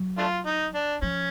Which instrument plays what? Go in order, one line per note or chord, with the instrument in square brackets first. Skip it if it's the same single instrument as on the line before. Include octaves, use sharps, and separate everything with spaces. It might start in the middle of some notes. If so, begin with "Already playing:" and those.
Already playing: [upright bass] F#3
[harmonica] A3 D4 F4
D#4
D4
[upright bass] F3 [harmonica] C#4